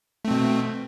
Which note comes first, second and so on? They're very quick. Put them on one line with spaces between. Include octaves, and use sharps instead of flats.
A3 C4 B2